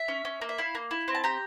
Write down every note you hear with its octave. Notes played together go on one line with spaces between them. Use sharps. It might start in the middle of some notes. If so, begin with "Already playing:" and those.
Already playing: E5
C#4
C#4
A#3
E5
E4 F5
A#3
E4
C4
A5
G4 A#5